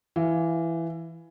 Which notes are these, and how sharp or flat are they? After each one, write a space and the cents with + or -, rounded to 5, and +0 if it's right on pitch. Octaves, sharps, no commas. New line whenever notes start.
E3 +10 F5 +0